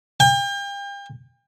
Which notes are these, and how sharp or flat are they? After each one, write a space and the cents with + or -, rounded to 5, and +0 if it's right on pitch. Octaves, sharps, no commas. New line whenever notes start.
G5 +40